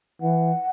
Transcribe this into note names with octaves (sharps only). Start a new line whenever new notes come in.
E3 F#5